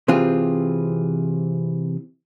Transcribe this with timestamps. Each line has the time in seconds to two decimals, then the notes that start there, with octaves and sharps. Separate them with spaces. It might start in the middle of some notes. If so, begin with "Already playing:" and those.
0.08 C3 E3 C4 F4 G#4